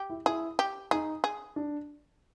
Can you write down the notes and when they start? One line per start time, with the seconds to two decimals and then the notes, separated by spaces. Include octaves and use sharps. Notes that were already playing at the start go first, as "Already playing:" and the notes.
Already playing: G4
0.10 E4
0.26 E4 G#4
0.59 G4
0.91 D#4 G#4
1.24 G#4
1.56 D4